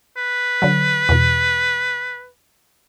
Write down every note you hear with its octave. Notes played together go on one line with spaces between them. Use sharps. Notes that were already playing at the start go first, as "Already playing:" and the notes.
B4
D3 F#3
E2 B2